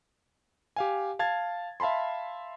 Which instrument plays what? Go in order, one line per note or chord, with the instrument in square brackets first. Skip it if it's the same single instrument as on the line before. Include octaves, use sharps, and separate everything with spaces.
[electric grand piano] G4 F5 G#5
F5 A5 G#6 A6
E5 F5 A5 B5 C6